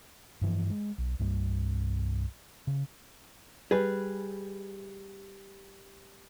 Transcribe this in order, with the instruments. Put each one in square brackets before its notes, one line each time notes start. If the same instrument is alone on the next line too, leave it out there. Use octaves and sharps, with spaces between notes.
[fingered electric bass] G2 E3 F3
G#3
B1
C2 G2 G3
C#3
[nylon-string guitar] G3 [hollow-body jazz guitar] G#4 B4